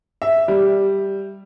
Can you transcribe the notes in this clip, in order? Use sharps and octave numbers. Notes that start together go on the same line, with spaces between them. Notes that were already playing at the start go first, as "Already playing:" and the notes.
E5
G3